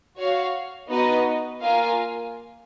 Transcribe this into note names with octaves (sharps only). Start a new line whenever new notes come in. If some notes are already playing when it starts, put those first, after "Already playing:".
F#4 C#5 F5
B3 D#4 F#4 B4 D#5
A#3 F4 A#4 F5 G#5